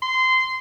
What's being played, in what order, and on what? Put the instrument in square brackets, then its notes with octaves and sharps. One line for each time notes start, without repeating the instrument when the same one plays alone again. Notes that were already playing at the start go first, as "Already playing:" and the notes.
[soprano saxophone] C6